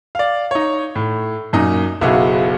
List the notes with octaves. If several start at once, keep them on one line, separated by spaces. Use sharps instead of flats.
D5 F5
D#4 C#5
A2
F#2 A#2 D#4 D#6
F#1 B1 E4 F#4 G#4 F5